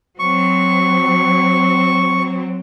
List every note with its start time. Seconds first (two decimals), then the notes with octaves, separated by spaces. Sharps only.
0.19 F#3 C4 C#6